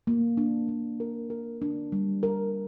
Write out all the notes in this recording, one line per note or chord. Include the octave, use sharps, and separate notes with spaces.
A#3
D4
A#3
A#4
A#4
D4
G3
A#4